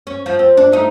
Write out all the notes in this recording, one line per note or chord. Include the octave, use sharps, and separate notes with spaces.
C#4
F3
C4
D4
A3 D#4